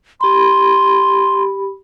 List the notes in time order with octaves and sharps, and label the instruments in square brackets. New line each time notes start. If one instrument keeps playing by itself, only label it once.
[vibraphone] G4 B5 [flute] C6